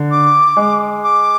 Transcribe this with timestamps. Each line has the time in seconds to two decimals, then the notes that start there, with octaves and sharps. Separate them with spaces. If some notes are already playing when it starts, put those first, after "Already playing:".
Already playing: D3
0.11 D6
0.57 G#3
1.04 D6